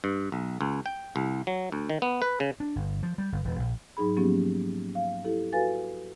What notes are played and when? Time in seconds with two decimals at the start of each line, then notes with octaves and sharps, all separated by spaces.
0.04 G2
0.32 B1
0.61 C#2
0.86 G5
1.16 C2
1.47 F#3
1.72 D2
1.89 D#3
2.02 B3
2.22 B4
2.40 C#3
2.60 D4
2.76 G1
3.03 F3
3.18 G3
3.32 G1
3.44 E1
3.59 A#1
3.97 G#2 F#3 D#4 G#4 B5
4.17 F3 F#3 A#3 B3 C#4 G4
4.95 F5
5.24 E4 G4 A4
5.53 F#4 A4 B4 F5 G#5 A6